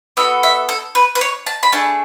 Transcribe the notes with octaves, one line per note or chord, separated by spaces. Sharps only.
B3 F#4 A4 E5
E5
A4
B4
B4
C#5
A5
B5
A3 D4 G#4 A5